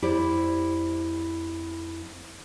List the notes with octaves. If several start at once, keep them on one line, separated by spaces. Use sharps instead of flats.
F2 E4 G4 C5 D5